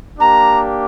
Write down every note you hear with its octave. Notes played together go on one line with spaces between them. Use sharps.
A#3 D4 G4 A#5